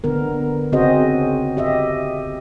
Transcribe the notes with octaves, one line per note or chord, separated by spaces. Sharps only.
D3 B3 A#4
C#3 C4 F#4 G#4 C5 D#5
G4 D#5 E5